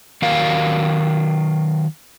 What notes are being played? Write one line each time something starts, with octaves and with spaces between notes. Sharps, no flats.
D#3 F#3 A#4 D5 F5